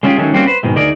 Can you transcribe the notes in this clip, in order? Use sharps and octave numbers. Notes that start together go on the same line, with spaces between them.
G#3 C#4 E4 F4 G4 G#4
D#3 F#3 G#3 A3 C#4
G3 A#3 C4 C#4 F#4
B4 C5
G#2 B2 D#3 G#3
D2 D#4 G#4 A#4 D5